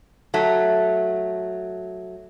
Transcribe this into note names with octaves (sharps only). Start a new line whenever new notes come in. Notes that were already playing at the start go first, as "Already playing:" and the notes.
F#3 A3